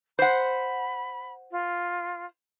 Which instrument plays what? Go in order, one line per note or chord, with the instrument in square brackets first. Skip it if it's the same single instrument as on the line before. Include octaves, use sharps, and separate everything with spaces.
[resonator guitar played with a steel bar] C5 F#5 [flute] B5
[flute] F4